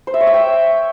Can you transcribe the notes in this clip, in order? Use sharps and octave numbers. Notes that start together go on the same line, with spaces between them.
C5
E5
C#5
E5
G5